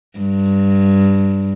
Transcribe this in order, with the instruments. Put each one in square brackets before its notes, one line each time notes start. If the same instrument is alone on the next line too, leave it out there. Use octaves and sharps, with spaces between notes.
[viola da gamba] G2